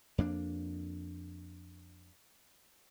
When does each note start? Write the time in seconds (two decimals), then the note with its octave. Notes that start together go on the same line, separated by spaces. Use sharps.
0.18 F2 A#3 D4